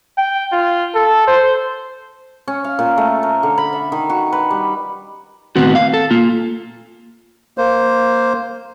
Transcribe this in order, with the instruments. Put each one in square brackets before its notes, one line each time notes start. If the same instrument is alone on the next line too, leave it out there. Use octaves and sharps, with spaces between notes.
[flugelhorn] G5
F4
A4
C5
[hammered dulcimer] C#4
F5
A#2
A3
A#4
D3
B5
E5
D#3
F#4
B4
G3
[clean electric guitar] A2 D#3 B3 C4 F#4
F5
A4
A#3 F4
[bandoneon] A#3 C5